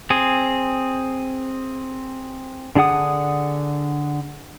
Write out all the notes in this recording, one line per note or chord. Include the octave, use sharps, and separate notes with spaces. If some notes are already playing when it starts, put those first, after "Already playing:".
C4 G#4
D3 D4 G#4 F#5 D#6